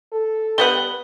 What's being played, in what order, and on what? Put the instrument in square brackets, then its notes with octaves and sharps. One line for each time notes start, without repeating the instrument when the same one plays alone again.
[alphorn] A4
[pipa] G3 B3 F#5 [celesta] G7